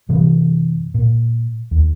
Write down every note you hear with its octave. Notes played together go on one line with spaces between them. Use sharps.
F#2 C3 E3 G3
A#2
D#2